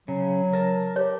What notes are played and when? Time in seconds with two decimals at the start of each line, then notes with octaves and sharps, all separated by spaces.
0.08 C#3 F#3
0.53 A#4 A5
0.96 G4 C#5